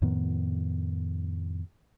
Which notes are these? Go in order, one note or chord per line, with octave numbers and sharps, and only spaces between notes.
F2 A2 D#3 B3